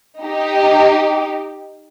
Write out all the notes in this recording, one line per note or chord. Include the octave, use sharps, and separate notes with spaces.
D#4 G4